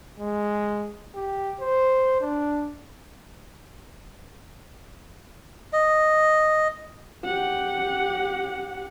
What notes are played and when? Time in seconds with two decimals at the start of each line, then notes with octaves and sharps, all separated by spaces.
0.20 G#3
1.15 G4
1.60 C5
2.21 D4
5.73 D#5
7.25 G4 F#5